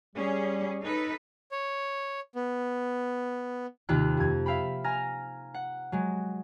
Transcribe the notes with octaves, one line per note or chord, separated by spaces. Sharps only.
G3 C#4 G#4
D#4 A4 B4
C#5
B3
D#2 C3 D#3 F4 G5 F#6
F2 G#6
E5 F5 G5 B5
G#5 A#5 F6 A#6
F#5
F#3 G#3